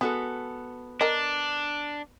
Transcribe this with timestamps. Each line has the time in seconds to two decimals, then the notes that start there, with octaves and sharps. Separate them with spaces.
0.01 G#3 B3 F#4 A4
1.01 D4 A#4 D#5